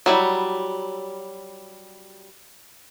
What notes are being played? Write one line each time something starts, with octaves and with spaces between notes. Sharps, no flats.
F#3 G3 E4